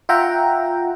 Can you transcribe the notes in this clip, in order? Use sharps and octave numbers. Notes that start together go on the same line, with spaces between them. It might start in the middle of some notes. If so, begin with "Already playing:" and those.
F4 E5 F#5 G5 A#5